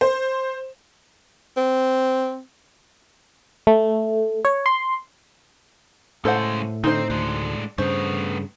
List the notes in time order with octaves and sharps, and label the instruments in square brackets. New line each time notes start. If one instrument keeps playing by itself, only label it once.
[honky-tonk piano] C5
[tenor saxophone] C4
[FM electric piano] A3
C#5
C6
[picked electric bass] A2 [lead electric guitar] C#3 G#3 [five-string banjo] A4 C5 F#5
[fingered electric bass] D3 [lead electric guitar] C4 [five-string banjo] D#4 C5
[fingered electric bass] D2 [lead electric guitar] G#3 D4
[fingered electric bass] G2 C#3 [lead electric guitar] A3 B3 [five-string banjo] C5